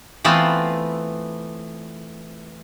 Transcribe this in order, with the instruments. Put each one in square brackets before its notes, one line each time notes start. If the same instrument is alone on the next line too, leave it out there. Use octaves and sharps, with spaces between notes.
[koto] E3 A3 B3 C4 F4